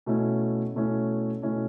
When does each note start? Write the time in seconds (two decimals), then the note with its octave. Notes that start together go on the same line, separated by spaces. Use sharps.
0.06 B2 A3 C#4 E4
0.75 B2 A3 C#4 E4
1.43 B2 A3 C#4 E4